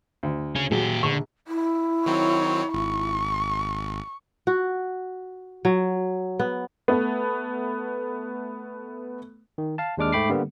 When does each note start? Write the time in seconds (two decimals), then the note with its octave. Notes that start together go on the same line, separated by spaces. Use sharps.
0.23 D2
0.56 C#4 G#4
0.71 A#2 F#3 G4 G#4
1.03 A#1 D3 C#6
1.48 E4
2.06 D#3 F#3 C4 C#5
2.74 G#1 C#6
4.47 F#4
5.65 F#3
6.39 B3
6.88 A3 B3
9.58 D#3
9.78 F5 A5
9.97 D#2 G#3 D4 D6 F6
10.13 G#2 A3 G5 B5 D6 C7
10.29 D3 G3 A#3 B3